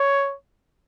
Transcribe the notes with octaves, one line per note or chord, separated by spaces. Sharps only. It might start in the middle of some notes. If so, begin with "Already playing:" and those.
Already playing: C#5